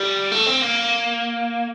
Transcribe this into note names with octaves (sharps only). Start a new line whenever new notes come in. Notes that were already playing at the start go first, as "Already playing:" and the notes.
Already playing: G3
A3
C4
A#3